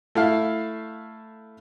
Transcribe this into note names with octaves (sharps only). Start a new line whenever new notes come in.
A3 E4 F5